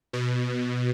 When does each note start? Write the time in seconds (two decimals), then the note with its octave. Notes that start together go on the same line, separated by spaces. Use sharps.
0.13 B2